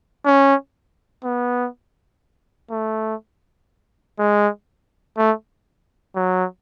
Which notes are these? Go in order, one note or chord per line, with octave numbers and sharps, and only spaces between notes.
C#4
B3
A3
G#3
A3
F#3